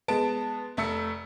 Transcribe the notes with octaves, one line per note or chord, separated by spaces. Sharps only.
G#3 B3 A5 D7
F1 A3 E6 C#7